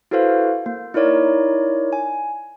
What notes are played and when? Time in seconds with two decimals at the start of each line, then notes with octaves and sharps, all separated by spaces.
0.11 E4 F#4 A4 B4 C5 F5
0.66 A#3
0.94 D#4 E4 A#4 C#5 D5
1.93 G#5